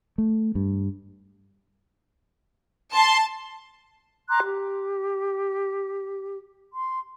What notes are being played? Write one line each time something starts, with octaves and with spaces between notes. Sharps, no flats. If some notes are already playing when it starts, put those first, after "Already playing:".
A3
G2
A5 C6
A#5 C6 D6 F#6
G4
C6